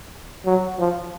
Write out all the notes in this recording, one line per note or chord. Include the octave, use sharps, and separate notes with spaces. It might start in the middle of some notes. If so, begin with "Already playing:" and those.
F#3
F3